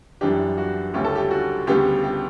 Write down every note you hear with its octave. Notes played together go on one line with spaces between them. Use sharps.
F#2 E3 G3 D4 G4
F#4
D2 C#3 G3 C#4 E4 G4
A4
G4
F#4
D2 C#3 G3 B3 G4
G4